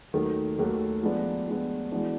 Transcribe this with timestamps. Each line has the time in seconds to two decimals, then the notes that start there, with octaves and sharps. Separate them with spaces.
0.13 D#2 D#3 F#3 A3
0.58 D#2 D#3 F#3 A3
1.03 F3 G#3 B3 D4
1.47 F3 G#3 B3 D4
1.91 E3 G#3 B3 D4 F#4